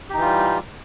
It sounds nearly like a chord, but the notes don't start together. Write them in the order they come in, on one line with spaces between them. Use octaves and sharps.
G4 D#4 E3 F4 G3